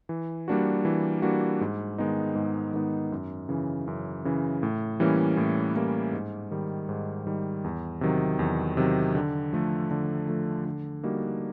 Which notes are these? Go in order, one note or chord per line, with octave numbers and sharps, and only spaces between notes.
E3
G3 A#3 D4 F#4
E3
G3 A#3 D4 F#4
G#2
D#3 G#3 B3 D#4
G#2
D#3 G#3 B3 D#4
F#2
C#3 E3
F#2
C#3 E3
A2
E3 G3 A#3 C#4
A2
E3 G3 A#3 C#4
G#2
D#3 G3
G#2
D#3 G3
E2
C3 D#3 F#3
E2
C3 D#3 F#3
D3
F3 A3
D3
F3 A3
D3
G3 A#3 D#4 F#4